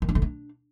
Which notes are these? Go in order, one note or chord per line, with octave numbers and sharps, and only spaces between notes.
D#3
D4
D3
D4